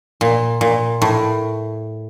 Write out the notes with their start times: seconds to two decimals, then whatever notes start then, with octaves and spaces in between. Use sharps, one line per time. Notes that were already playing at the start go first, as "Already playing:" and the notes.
0.21 A#2
0.61 A#2
1.02 A2